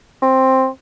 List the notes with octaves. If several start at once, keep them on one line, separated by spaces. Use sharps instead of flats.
C4